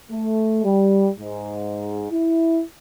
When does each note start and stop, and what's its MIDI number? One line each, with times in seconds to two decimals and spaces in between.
0.11 0.64 57
0.64 1.09 55
1.19 2.07 44
2.11 2.62 64